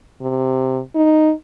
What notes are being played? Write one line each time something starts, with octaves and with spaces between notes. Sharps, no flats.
C3
D#4